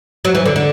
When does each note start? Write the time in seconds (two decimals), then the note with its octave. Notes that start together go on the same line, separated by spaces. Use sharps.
0.25 F#3
0.35 E3
0.46 D3
0.56 D3